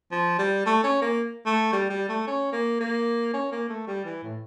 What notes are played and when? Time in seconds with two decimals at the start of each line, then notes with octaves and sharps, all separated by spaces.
0.11 F3
0.38 G3
0.66 A3
0.84 C#4
1.02 A#3
1.46 A3
1.73 G3
1.90 G3
2.09 A3
2.27 C#4
2.52 A#3
2.80 A#3
3.34 C#4
3.52 A#3
3.69 A3
3.87 G3
4.05 E3
4.23 A2